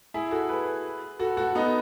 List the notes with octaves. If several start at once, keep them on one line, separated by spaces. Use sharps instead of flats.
E4 G#4
F#4 A4
G#4 B4
F#4 A4
F#4 A4
B3 D#4